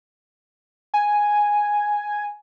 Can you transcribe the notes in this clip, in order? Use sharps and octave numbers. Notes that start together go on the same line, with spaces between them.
G#5